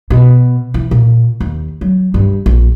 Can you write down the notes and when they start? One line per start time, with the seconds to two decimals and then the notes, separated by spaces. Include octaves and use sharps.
0.10 B2
0.74 E3
0.91 A#2
1.40 D#2
1.81 F#3
2.14 G2
2.46 A#1